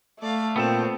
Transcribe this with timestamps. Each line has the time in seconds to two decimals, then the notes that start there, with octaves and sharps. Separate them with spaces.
0.21 A3 D5 F5
0.56 A#2 B3 C4 A4 G5 A5